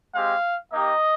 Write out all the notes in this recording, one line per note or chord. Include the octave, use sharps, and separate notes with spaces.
G#3 C4 G4 F5
A#3 D#4 G4 D#5